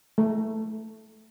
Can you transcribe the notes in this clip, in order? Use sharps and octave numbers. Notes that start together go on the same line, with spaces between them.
A3